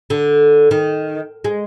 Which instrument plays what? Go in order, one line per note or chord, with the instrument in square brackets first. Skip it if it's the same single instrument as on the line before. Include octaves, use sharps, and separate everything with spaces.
[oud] D3
D#3
G#3